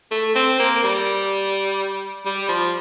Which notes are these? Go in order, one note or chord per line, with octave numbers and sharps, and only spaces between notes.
A3
C4
A#3
G3
G3
F3